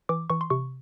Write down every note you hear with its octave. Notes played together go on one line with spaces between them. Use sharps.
E3 D6
E3 C#6
C6
C3 C#6